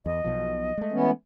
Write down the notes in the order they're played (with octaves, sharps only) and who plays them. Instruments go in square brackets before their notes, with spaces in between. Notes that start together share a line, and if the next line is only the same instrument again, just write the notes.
[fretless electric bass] E2 [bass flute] D#5
[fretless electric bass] B1 B2 F3
G#3 A3
[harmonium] E3 B3 C#4